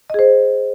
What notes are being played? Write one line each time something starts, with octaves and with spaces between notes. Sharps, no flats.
G#4 C5 D#5